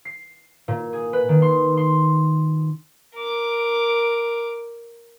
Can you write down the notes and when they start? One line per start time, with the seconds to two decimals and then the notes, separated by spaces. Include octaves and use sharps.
0.05 C7
0.68 A#2
0.93 G#4
1.13 B4
1.29 D#3
1.42 C6
1.77 C6
3.15 A#4 D6